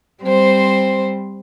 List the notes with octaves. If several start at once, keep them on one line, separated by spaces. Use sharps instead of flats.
G3 C4 C5